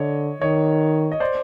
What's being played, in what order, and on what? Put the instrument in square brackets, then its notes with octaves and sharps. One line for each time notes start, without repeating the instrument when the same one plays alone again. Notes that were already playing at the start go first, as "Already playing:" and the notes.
Already playing: [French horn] D3 [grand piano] C#5 D#5
[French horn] D#3 [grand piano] C#5 D#5
[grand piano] D#5
C5 D5